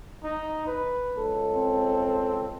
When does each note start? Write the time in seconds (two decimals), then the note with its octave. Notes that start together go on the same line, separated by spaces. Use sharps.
0.24 D#4
0.67 B4
1.17 C#2 A4
1.54 C4